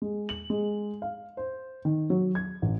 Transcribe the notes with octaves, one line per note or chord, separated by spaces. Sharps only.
G#3
F#7
G#3
F5
C5
D#3
F#3
G#6
A1